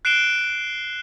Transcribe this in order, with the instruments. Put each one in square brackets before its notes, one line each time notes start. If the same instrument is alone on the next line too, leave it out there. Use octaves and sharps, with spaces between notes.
[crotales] F#6 C7 D7 E7 G7